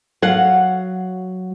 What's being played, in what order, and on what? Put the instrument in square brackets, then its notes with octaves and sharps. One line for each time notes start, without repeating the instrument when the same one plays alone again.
[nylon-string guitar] F#3 F5 F#5